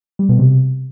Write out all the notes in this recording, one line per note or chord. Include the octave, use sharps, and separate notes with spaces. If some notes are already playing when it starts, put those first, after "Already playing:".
G3
B2
C3